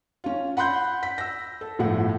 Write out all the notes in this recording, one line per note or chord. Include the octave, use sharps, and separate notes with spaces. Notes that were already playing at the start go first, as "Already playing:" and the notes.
C#4 F4
F#5 B5 C6 F#6 G6
B6
E6 A#6
A4
G1 A2 F3 F#5